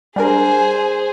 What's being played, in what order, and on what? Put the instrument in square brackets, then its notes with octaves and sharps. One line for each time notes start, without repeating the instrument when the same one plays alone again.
[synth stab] G3 D4 A#4 [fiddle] G#4 C5 [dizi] G#5